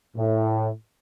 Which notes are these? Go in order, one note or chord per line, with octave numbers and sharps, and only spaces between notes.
A2